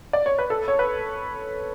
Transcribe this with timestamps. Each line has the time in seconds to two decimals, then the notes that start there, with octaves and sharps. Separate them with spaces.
0.13 D5
0.26 C#5
0.39 B4
0.50 A4
0.68 C#5
0.79 B4